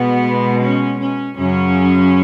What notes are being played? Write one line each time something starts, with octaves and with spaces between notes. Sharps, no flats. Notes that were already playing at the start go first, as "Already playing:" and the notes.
Already playing: B2 G#3 B3
C#4
C#4
F#2 C#3 F#3 C#4